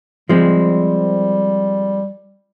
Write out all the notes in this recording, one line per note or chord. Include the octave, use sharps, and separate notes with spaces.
F3 G3 G#3 C4